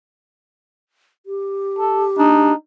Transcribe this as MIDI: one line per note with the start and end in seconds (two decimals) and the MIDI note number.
1.26 2.53 67
1.79 2.05 69
2.19 2.52 62
2.19 2.54 63